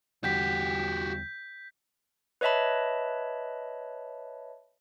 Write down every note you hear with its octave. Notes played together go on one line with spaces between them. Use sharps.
E2 D3 G3 F#4 G4 G6 B6
B4 C#5 D#5 E5 A5 B5